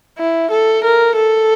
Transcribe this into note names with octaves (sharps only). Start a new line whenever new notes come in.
E4
A4
A#4
A4